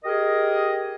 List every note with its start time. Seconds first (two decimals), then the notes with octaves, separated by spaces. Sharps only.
0.05 G4 G#4 A#4 D#5